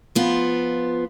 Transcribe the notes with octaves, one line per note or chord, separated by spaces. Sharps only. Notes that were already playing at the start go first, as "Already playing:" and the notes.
F3 B3 F4